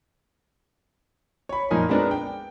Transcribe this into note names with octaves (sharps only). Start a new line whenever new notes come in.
C#5 B5
F2 A#2 D#4 A#4 G#5
G#3 B3 C4 D4 A#4
G5